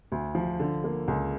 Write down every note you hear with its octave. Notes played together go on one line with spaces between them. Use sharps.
D2
F3
D3
A#3
C#2